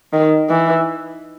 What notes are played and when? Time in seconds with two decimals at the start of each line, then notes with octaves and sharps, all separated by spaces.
0.13 D#3
0.50 E3